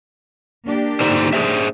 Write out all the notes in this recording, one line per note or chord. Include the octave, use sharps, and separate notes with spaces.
A#3 D4 G4
D3 D#4 C5
G#4 C5 E5